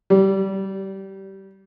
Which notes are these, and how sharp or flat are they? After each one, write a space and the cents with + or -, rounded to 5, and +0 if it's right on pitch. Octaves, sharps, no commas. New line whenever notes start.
G3 -20